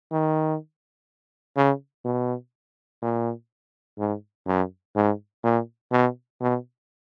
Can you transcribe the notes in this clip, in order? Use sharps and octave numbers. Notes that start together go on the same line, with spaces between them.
D#3
C#3
B2
A#2
G#2
F#2
G#2
A#2
B2
B2